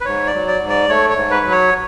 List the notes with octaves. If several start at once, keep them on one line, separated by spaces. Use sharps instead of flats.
B4
G#2 C#5
D5
F#3
D5
G#2
D5
A3 C#5
C#5
G#2
B4
F#3
C#5